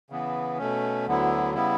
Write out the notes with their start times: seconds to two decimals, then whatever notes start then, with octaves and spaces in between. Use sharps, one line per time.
0.10 C#3 E3 B3
0.58 B2 A3 C#4
1.06 D2 D3 F#3 B3 E4
1.54 C#3 G3 B3 E4